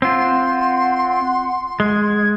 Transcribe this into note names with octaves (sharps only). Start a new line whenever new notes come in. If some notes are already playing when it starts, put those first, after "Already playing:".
C4 F4 F#5 C6
G#3 G#6